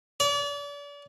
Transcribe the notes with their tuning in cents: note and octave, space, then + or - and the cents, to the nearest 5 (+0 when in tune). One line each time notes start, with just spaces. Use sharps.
D5 -40